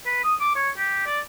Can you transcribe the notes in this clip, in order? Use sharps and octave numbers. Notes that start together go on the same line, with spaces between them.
B4
D#6
D6
C#5
G4
D5